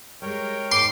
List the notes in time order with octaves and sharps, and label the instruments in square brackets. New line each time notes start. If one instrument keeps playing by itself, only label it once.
[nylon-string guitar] G3 G#3 [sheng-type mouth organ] A#4 C#5 G5
[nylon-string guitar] G#2 [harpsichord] C6 [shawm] D6